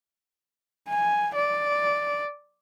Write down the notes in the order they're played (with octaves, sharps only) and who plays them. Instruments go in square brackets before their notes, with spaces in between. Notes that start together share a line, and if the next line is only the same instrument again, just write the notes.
[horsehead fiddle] G#5
D5